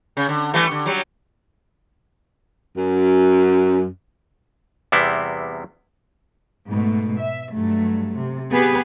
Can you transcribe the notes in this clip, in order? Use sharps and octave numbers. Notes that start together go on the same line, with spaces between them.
C#3
D3
E3 G3 A3
D3
F#3 G3
F#2
E2 C3 G3 B3 C4 E4
G#2 B2 A3
E5
G2 F#3 A3
C3
B3 G4 G#4 B4